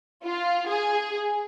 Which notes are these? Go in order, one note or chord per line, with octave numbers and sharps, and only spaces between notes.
F4
G#4